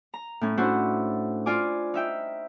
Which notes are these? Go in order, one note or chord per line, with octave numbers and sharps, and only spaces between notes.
A#5
A2 C#4
C#4 D4 E4 F#4 C5
F4 D5 G#5 D6
D#4 E5 G5